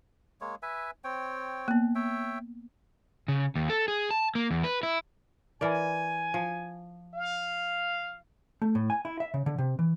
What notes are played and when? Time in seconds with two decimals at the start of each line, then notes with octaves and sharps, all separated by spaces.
0.41 G#3 A#3 C#5
0.62 B4 E5 G#5
1.04 C4 C#5 G5
1.68 A#3 B3
1.95 C#5 E5 G5
3.28 C#3
3.55 D#2
3.70 A4
3.88 G#4
4.11 A5
4.35 A#3
4.51 E2
4.64 B4
4.83 E4
5.61 E3 A#4 D5 G#5
6.34 F3
7.14 F5
8.62 A3
8.75 A2
8.90 G#5
9.05 E4
9.20 E5
9.34 C#3
9.46 D3
9.58 C3
9.79 E3